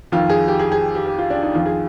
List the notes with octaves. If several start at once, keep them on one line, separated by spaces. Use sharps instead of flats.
F2 D#3 F4
G#4
G4
G#4
G#4
G4
G4
F4
D4
D#4
F2 D#3 F4
G#4